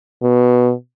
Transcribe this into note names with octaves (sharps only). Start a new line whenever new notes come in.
B2